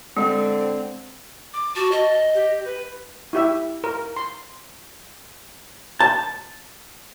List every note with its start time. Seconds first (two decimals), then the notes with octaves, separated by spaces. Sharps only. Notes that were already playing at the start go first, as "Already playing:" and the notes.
0.17 D3 G#3 C4
1.54 D6
1.76 F#4 A5
1.92 D#5
2.35 G4
2.65 B4
3.33 E4 G4 E5
3.84 A#4
4.16 C6
6.00 A5